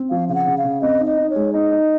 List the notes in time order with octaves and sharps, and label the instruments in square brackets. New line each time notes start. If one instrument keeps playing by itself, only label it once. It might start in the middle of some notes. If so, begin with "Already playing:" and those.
Already playing: [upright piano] C4
[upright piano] F3 [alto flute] F5
[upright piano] C#3 [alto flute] F5
[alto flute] F#5
[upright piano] C#3
[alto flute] F5
[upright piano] C#3
[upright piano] C4 [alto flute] D#5
[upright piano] D#4
[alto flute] D#5
[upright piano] D#4
[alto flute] C#5
[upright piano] G#3
[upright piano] D#4 [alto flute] D#5
[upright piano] D#4